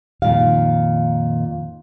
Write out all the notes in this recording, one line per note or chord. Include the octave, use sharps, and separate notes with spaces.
F2 A#2 D#3 F5